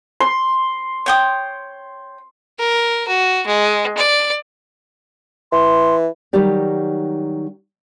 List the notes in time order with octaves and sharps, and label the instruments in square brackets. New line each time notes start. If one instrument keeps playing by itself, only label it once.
[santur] C6
[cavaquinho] C#5 G5 D#6
[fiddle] A#4
F#4
G#3
D5
[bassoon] E3 [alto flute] C6
[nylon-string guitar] D#3 F#3 G3 D#4 G4 D5